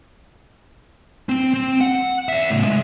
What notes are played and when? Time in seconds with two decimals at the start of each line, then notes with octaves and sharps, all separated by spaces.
1.29 C4
1.54 C4
1.81 F#5
2.29 E5 F#5
2.50 A2 C#3
2.64 G#3 A3